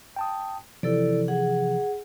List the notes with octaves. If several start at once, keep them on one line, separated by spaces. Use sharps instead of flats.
G5 A5 D#6
C3 E3 F3 E4 A4 D5
G#4 F#5